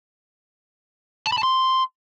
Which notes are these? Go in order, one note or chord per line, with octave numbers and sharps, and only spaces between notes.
A5
B5
A5
C6